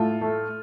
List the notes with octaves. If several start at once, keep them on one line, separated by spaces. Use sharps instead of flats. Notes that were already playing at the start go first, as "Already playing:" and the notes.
Already playing: A2 F4 A4
A3